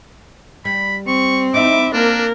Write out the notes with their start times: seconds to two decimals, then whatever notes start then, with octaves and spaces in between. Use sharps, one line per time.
0.65 G3 B5
1.07 C4 C#6
1.54 D#4 E4 E5 D6
1.93 A#3 D4 A#4